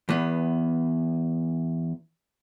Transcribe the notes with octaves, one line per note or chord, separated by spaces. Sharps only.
E2 B3